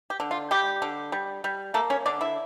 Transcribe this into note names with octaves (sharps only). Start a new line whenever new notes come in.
G4
D3
F4
G3 G4
D3
G3
G3
A3 A#3 A4
C#4 C#5
D3 D4 D5
E4 E5